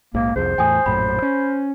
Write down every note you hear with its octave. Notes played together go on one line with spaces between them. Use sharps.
A#1 G#2 A#3
C2 F2 G#4 C5
E2 A2 G5 G#5 D#6
A#1 F#2 A2 B5
C#4